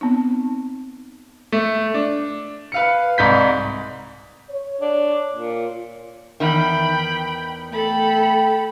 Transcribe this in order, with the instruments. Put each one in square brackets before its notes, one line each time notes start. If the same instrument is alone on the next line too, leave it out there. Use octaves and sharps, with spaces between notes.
[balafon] B3 C4 D#4
[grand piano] A3
D4
B4 F5 C#7
C2 G#2 B5 G6 B6
[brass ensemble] C#5
[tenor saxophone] D4
A#2
[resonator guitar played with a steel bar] E2 D#3 [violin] G5 B5
[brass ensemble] A3 G5 [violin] A4 B5